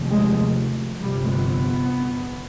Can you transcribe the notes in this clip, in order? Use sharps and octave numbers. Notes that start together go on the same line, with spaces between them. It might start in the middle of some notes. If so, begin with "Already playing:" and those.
Already playing: F1 D#2
G#3
G1 F2 C3 G3
B3